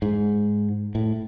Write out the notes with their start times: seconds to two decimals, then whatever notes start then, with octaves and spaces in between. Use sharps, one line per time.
0.02 G#2
0.95 A2